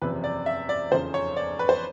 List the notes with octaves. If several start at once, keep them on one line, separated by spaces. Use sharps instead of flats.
F#1 E2 C3 F3 B4
D5
E5
D5
F1 E2 C#3 F3 C5
C#5
D5
B4
C5